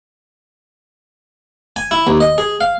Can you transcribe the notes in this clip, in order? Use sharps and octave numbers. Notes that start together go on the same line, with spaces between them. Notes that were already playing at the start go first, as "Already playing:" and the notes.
G#5
E4
D#2
D#5
G#4
F5